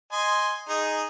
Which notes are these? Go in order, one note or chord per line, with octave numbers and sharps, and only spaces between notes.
D#5 G#5 C6
D#4 G#4